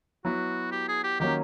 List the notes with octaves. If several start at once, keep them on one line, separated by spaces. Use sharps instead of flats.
F#3 B3 E4 F#4
G4
G#4
G4
D#3 F#3 A#3 C#4 G4